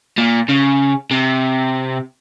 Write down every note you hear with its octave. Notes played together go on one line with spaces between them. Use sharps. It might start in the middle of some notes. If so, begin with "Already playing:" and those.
A#2
C#3
C3